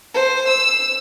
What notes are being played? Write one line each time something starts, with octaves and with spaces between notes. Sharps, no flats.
C5
E6